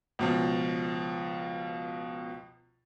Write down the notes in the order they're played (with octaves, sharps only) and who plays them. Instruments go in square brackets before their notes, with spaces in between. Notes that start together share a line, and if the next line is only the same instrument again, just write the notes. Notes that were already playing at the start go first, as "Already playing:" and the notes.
[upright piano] C#2 B2 F3